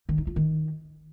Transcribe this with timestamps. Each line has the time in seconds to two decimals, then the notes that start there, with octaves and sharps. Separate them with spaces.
0.09 D#3
0.18 D#4
0.27 F4
0.36 D#3